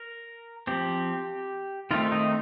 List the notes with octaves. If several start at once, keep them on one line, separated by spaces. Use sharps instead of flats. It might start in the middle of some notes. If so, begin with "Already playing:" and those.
Already playing: A#4
F3 C4 G4
D#3 A3 C4 F4
D#4